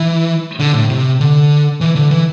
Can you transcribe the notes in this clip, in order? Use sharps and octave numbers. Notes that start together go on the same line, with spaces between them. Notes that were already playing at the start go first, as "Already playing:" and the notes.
Already playing: E3
D3
A2
C3
D3
E3
D3
E3